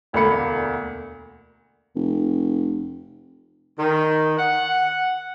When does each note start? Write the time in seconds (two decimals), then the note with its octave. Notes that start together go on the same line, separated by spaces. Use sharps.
0.13 E1 D2 D3 A#3 B5 C#7
1.95 F1
3.79 D#3
4.37 F#5